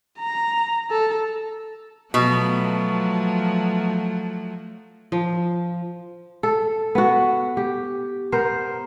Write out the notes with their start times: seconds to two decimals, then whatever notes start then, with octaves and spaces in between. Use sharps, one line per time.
0.19 A#5
0.90 A4
2.14 B2 F3 F#3 A3
5.12 F3
6.43 A4
6.95 B3 F#4
7.57 G4
8.32 B3 A#4 C5